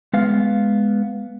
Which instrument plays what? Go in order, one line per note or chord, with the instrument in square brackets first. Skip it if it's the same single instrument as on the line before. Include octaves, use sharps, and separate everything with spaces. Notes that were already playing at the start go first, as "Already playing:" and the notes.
[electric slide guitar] G#3 B3 F5